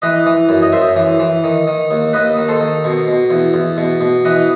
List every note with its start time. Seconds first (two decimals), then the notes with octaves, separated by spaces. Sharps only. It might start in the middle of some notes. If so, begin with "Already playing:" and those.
0.02 E3 B4 D#5
0.26 E3
0.49 F#2
0.62 D#5
0.72 F#2 C5 E5
0.96 E3
1.20 E3
1.44 D#3
1.67 D#3
1.91 D#2
2.13 D#2 B4 D#5
2.38 D#3
2.48 A4 C5
2.60 D#3
2.84 B2
3.08 B2
3.30 E2
3.54 E2
3.77 B2
4.01 B2
4.25 E3 B4 D#5